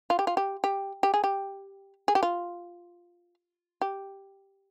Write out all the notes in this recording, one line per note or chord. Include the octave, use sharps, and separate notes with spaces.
F4
G4
F4
G4
G4
G4
G#4
G4
G#4
G4
F4
G4